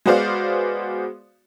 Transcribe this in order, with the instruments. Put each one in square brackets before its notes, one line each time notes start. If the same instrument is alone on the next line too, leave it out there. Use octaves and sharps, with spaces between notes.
[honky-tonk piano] G#3 B3 F#4 C5 D5 F5